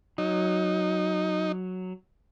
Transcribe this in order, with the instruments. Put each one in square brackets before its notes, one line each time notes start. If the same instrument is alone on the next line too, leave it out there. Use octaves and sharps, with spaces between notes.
[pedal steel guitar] F#3 [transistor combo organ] D#4